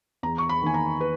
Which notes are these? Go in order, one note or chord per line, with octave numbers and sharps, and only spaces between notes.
E2 A#5
C#6
B5
D#3 A#3 D#4 G#5
A#5
B4